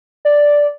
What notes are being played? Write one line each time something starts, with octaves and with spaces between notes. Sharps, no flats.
D5